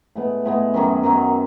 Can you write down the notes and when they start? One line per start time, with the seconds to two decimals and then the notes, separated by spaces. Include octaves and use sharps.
0.15 A2 G#3 B3
0.45 A2 G#3 B3
0.74 F#2 D#3 F#3 C#4
1.03 F#2 D#3 F#3 C#4